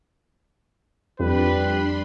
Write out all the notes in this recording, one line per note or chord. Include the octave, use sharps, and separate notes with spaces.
F2 G3 D4 B4 B5 C6